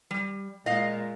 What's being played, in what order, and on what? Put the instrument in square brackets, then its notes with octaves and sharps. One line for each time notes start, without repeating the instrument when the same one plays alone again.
[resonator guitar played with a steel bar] G3
[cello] A#2 G#3 [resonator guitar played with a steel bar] D#5 F5